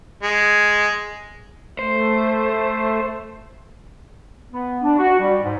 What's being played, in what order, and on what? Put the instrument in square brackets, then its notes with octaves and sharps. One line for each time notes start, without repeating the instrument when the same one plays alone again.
[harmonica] G#3
[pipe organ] A3 [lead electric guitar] C5
[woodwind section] B3
D4
F#4
G3
G#2